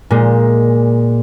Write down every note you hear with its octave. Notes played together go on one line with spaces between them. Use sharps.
A#2 G#3